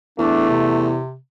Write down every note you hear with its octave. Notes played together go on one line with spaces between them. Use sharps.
E2 A3 D4
C3